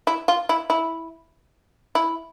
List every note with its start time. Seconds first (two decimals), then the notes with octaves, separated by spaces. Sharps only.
0.07 E4
0.28 F4
0.49 E4
0.70 E4
1.95 E4